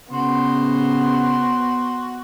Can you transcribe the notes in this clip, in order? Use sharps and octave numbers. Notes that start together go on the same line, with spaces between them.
C#3 B3 F#4 C5 C6